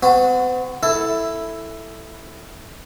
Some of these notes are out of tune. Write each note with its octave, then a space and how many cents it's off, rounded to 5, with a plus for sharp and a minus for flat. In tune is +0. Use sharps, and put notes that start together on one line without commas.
C4 -45 F#4 -10
E4 +0 A4 +5